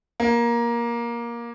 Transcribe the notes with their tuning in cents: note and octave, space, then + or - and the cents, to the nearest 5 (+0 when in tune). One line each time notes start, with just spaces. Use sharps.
A#3 +15